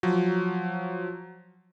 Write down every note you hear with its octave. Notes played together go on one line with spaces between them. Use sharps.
F3 F#3